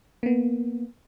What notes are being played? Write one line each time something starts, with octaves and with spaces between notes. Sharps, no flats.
A#3 B3